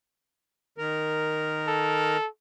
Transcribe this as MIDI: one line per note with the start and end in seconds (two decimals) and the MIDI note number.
0.78 2.17 51
0.78 2.17 70
1.67 2.27 69